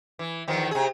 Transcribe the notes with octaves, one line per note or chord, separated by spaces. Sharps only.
E3
E2 D#3 F3
C3 G#4